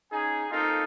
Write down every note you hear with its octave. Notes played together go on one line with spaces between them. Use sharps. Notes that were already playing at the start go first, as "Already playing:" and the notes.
C#4 D#4 G#4 G#5
A#3 C4 D#4 F4 A4